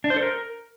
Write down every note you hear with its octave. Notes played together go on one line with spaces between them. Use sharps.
D4
C5
A4
A#4